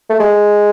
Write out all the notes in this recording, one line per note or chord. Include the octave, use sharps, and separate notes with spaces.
A3
G#3